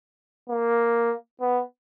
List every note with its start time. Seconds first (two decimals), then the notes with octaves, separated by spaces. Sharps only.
0.49 A#3
1.41 B3